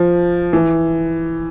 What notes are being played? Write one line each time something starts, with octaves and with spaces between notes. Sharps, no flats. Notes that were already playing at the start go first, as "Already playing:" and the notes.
Already playing: F3
E3